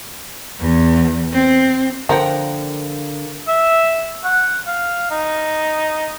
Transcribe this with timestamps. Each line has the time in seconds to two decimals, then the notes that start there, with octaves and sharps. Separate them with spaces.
0.60 E2
1.33 C4
2.09 D3 F3 A#3 A#4 F#5 G5
3.48 E5
4.24 F#5
4.67 F5
5.11 D#4